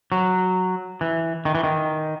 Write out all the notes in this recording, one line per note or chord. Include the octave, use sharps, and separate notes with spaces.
F#3
E3
D#3
E3
D#3